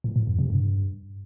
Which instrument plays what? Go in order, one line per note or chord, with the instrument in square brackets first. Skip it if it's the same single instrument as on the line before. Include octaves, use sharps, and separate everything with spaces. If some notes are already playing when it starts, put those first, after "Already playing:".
[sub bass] A2
A2
F2
C3
G2